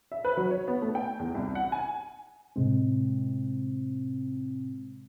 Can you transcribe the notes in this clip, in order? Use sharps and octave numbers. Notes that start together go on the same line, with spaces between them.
E5
B4
F#3
C#5
B3
A3
G5
E2
C2
F#5
G#5
A2 C3 G#3 C4